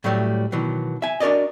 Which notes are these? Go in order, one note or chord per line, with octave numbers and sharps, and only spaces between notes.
A2 F#3 G3 A3
B2 D#3 E3 F#3
E5 G#5
D4 F#4 A#4 D5 D#5